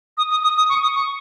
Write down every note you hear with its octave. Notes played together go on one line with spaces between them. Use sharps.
D#6
D#6
D#6
D#6
C#6
D#6
C#6